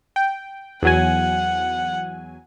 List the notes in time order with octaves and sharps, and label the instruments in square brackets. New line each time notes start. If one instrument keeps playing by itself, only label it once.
[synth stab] G5
[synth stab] E2 F#3 G#5 [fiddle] F#5